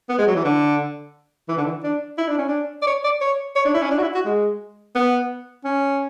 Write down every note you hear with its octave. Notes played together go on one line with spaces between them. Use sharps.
B3
G#3
F#3
E3
D3
E3
D3
E3
D4
E4
D4
C#4
D4
D5
C#5
D5
C#5
C#5
D4
E4
C#4
D4
F#4
E4
F#4
G#3
B3
C#4